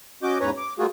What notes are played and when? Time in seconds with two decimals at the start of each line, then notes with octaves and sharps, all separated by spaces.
0.23 C#4 F#4 D#5 D6 G6
0.40 E2 G#2 C#4 B4 C#5 A#5
0.57 D6
0.79 G3 A3 A#3 F4 F#4 G#4